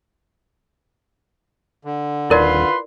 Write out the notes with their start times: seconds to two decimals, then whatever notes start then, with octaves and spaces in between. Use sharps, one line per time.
1.85 D3
2.30 D#1 E4 F4 A#4 B4 D5 C6